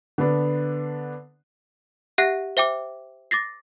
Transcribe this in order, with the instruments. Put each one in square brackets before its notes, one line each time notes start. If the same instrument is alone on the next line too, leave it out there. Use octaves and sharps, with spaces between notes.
[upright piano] D3 B3 D4
[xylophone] G4 E5 F#5 F#6 A#6 C7
C5 E5 G5 D6
D6 A6 A#6 C7